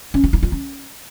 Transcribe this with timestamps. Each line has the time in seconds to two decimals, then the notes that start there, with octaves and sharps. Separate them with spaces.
0.14 C#4
0.24 F4
0.33 E4
0.43 F4
0.52 C#4